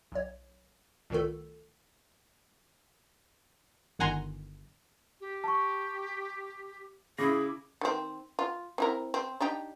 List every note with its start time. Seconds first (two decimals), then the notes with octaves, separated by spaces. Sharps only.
0.12 B1 C#5
1.10 C2 A#2 D#3 A3 A4
3.99 G1 D#3 F#5 G#5 A#5 C6
5.20 G4
5.44 A5 C#6
7.18 C#3 E4 G#4 D6 A#6
7.81 D#3 C4
8.39 F4
8.78 C4 E4 A#4
9.14 C4
9.40 D4 D#4 G4